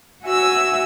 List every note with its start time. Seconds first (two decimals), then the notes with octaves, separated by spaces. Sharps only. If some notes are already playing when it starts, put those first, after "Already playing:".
0.23 F#4 E5 G#5 E6